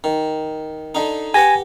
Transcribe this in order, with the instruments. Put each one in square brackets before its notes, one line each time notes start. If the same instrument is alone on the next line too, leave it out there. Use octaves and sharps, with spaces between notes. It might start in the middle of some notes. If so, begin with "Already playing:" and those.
[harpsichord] D#3
D3 D#4
[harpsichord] G4 B4 F#5 [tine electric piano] G#5 A#6